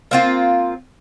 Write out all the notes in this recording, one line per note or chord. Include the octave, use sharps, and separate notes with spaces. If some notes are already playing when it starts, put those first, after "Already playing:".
A#3 C4 F4